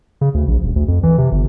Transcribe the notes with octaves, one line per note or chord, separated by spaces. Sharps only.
C#3
D2
A#1
D#1
D2
F2
E3
C3
G1